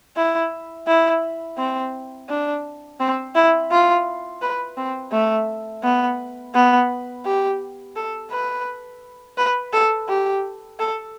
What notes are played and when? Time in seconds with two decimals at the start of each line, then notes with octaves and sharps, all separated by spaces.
0.17 E4
0.87 E4
1.57 C4
2.29 D4
3.00 C4
3.35 E4
3.71 F4
4.42 B4
4.77 C4
5.12 A3
5.83 B3
6.54 B3
7.25 G4
7.96 A4
8.31 B4
9.37 B4
9.73 A4
10.09 G4
10.79 A4